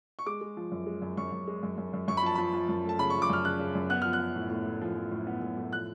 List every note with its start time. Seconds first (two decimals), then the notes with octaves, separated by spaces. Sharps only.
0.19 C#6
0.26 G#3 D6
0.41 G#3
0.57 F3
0.72 F#2
0.87 G#3
1.02 F#2
1.17 F#2 C#6
1.32 F#2
1.47 G#3
1.63 F#2
1.78 F#2
1.93 F#2
2.08 F#2 C#6
2.17 B5
2.23 F3 A5
2.35 F3 B5
2.53 F3
2.69 F#2
2.84 A3
2.89 A5
2.99 C#3 B5
3.10 C#6
3.14 F3
3.22 D6
3.30 F#2 F6
3.45 C#3 F#6
3.59 C#3
3.75 F#2
3.90 B3 F#6
4.02 F3 F6
4.13 F#6
4.20 B3
4.36 A2
4.50 A2
4.66 A2
4.81 F3
4.96 F3
5.11 A2
5.27 B3
5.42 A2
5.57 A2
5.72 F3 F#6